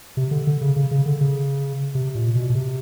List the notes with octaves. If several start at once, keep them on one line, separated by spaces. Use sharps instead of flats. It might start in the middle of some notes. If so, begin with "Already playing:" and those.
C3
D3
D3
C#3
C#3
C#3
D3
C#3
C3
A#2
B2
B2
C3